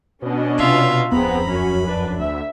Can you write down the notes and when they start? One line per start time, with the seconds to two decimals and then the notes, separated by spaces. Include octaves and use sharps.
0.22 B2 C#4 D4 D#5
0.59 C3 F4 E5 F5
1.12 D1 F2 B3 C4 G#4 A#5 B5
1.47 F#2 C#4 F#4
1.84 D4 B4
2.19 D2 E5